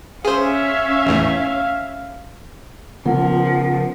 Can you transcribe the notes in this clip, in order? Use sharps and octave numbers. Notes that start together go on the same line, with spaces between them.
C#4 G#4 C5 E5 F5
G#1 E2 A2
C#3 F3 B3 F4 A#4 F#5